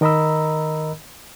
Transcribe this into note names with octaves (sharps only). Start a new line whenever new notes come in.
D#3 A#4 D#5 A#5 B5 E6